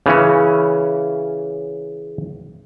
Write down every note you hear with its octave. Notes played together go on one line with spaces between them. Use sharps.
C#3 E3 C#4